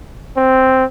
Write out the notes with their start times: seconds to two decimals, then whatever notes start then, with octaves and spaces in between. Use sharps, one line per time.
0.37 C4